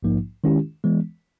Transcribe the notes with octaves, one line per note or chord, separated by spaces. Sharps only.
A#1 G#2 F3 A#3 D#4
D#3 G#3 C#4 E4 G4
E3 G#3 B3